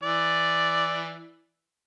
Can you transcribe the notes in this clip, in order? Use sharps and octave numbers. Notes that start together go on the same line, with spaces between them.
E3 D5